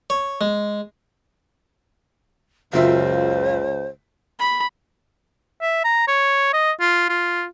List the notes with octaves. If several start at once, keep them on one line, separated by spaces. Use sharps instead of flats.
C#5
G#3
F#1 C#2 F#3 F4 C5 E5 F5
B5
E5
A#5
C#5
D#5
F4
F4